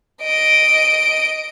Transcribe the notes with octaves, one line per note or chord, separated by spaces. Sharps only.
D#5 D7